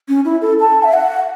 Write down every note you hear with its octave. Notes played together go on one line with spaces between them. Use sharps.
C#4
E4
A4
A5
E5
F#5